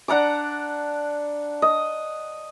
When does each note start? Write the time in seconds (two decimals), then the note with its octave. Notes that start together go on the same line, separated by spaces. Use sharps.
0.08 D4 F#5 A#5 D6
1.62 D#5